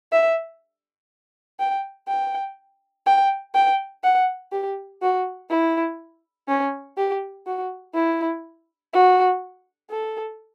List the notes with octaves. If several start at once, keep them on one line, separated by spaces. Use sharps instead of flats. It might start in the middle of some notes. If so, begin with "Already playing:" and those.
E5
G5
G5
G5
G5
F#5
G4
F#4
E4
C#4
G4
F#4
E4
F#4
A4